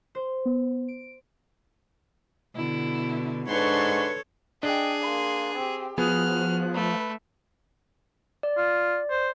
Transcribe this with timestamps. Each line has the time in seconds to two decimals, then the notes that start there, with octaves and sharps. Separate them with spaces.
0.15 C5
0.46 B3
0.88 D7
2.55 B2 D3 E4
3.48 G#2 D4 A4 B4 C#5 C6 C#6
4.63 D4 G#4 D#5 G5
5.03 A#3 C6
5.55 C4 G4
5.98 F3 B3 F#4 G#4 F6 F#6
6.74 A3 B4
8.43 D5
8.57 F4
9.10 C5